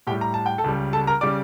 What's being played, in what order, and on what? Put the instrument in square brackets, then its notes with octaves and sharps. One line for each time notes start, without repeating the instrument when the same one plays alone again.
[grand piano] A2 G4 G5
G3
A#5
A5
G5
A4 A5
C#2 C#3 G3
A4 A5
A#4 A#5
C#3 G3 D5 D6